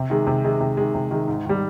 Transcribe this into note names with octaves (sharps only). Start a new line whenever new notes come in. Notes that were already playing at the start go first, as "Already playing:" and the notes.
Already playing: C3
D#3 G#3
C3
D#3 G#3
C3
D#3 G#3
C3
D#3 G#3
G#2
D#3 G3